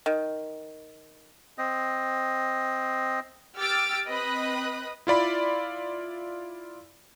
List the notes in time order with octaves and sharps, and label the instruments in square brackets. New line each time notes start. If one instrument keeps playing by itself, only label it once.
[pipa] D#3
[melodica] C4 D#5
[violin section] G4 D6 E6 F6 A6 D7
C4 B4 D#5 B5 D#6 F#6
[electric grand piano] E4 F4 D5 B5